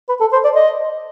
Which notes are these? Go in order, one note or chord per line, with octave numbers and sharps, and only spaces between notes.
B4
A4
C5
D5
D#5